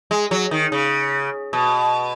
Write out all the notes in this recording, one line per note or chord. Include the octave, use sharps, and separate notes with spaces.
G#3
F#3
D#3
C#3
B2